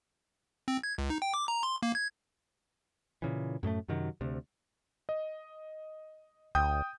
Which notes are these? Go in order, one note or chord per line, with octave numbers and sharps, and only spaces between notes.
C4
G#6
C#2
D#4
G5
D6
A#5
C6
A#3
G#6
A#2 C#3 E3
F#2 A2 G#3 A3
F#2 C3 D#3 F#3
D2 C3
D#5
D2 G5 D#6 G6